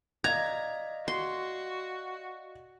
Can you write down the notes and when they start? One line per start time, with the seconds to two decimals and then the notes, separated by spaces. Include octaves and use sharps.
0.24 D5 D#5 F5 A#5 G#6
1.08 F#4 C6